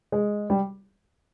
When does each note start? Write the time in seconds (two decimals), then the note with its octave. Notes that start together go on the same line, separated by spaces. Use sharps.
0.12 G#3
0.50 G3